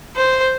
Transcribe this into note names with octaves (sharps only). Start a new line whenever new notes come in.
C5